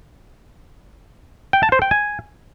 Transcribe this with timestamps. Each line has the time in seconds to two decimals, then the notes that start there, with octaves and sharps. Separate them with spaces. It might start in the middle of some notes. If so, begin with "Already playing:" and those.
1.53 G5
1.63 A5
1.72 C5
1.82 G5
1.91 G#5